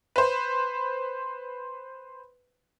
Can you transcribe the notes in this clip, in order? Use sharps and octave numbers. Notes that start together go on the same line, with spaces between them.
B4 C5